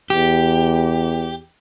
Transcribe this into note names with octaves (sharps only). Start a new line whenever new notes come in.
E2 G4